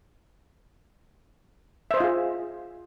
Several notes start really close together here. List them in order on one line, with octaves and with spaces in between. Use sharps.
E5 C5 D#5 F4 G#4